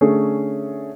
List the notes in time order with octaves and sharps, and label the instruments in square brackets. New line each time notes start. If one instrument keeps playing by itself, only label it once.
[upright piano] D3 A3 C#4 G#4 C#5